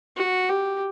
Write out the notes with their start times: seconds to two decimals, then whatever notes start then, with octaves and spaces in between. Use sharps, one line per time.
0.17 F#4
0.49 G4